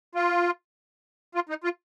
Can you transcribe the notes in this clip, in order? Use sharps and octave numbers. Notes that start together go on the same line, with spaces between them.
F4
F4
D#4
F4